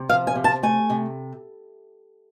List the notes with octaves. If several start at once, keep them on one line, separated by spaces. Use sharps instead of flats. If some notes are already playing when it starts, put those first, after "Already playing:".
Already playing: C3
F3 F5
G#5
C3
A5
A3 G#5
C3